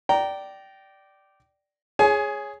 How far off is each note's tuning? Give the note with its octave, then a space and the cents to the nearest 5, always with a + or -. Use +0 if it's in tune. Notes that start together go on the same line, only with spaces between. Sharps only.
D5 +0 G5 -20 A#5 +0
G#4 +0 C#5 +0 G#5 +25